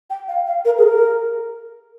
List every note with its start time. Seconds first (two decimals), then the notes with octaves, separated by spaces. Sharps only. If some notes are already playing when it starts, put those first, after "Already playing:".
0.10 G5
0.28 F5
0.47 F5
0.65 A#4
0.78 G#4
0.83 A#4